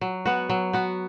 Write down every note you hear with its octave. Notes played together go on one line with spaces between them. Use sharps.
F#3
B3 F#4
F#3
B3 F#4